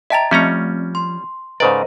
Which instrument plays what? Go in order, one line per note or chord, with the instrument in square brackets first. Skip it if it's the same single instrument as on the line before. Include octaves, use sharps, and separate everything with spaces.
[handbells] D#5 A5 A6 [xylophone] E5 G5 A#5
[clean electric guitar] F3 [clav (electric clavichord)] G3 C#4 A#5 [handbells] A3 C4 [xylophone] E5 C#7
[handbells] C6
[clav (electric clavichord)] G#2 C#3 D5 [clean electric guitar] A4 D#5 [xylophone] B4 C5 [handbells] A#5